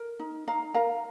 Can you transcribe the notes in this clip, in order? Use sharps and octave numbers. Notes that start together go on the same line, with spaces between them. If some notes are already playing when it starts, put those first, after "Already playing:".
Already playing: A#4
D#4
D#4 F5 A#5
A#4 F5 A#5